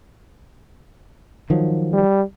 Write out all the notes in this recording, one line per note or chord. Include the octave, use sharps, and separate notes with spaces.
D#3 F3 F#3
G3